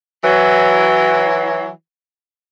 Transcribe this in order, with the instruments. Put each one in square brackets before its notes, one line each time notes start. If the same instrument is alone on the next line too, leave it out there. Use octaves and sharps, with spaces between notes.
[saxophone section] E3 F#3